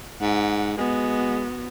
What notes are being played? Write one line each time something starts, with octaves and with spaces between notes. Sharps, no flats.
G#2 F#5
G#3 B3 F#4